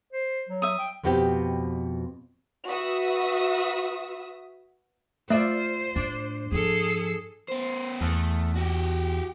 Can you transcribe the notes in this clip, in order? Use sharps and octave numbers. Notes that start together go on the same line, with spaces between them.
C5
F#3
E5 D#6
G5
F2 B2 B3 C4 F#4 G4
F#4 B4 E5 D#6
A3 F4 C5 D5 E5
A2 D4
G#2 F3 G#4 A4
B3 C5
E2 A3
F#4 G4